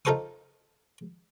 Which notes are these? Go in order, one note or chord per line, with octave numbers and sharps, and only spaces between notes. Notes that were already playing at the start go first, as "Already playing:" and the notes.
D#4 F4 A4 C5 C#6 D#6